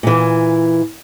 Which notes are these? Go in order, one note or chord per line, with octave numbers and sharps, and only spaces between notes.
A#2 E3